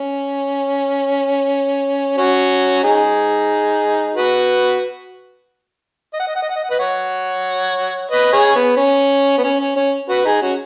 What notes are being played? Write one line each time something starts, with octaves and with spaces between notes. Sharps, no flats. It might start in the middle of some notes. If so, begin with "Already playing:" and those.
Already playing: C#4
C#4 F#4
D#4 G#4
F#4 B4
D#5
F#5
D#5
F#5
D#5
F#5
D#5
F#5
B4 D#5
C#5 F#5
B4 D#5
G#4 C#5
B3
C#4
B3
C#4
C#4
C#4
F#4 B4
D#4 G#4
C#4 F#4